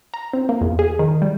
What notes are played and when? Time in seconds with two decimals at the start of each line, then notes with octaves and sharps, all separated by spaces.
0.14 A#5
0.33 C4
0.49 A#3
0.61 E2
0.79 G#4
0.99 D#3
1.22 G3